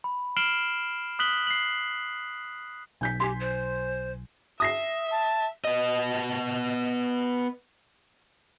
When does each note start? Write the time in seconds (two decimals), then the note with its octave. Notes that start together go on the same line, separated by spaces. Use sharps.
0.04 B5
0.37 F6 C7 D7 E7 F#7 G7
1.19 D#6 F#6 B6 F#7 G7
1.47 C7 F#7
3.01 B1 G#5 G6 B6
3.20 G4 G#5 C6
3.40 C5
4.60 E5 D#6 A#6 C7
5.12 A5
5.64 B3 D#5